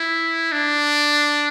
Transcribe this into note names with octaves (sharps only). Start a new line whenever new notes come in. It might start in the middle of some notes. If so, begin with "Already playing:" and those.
Already playing: E4
D4